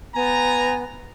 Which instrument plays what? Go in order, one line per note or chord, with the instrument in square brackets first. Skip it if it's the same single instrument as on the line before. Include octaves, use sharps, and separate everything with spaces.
[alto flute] B3 [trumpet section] G#5 A#5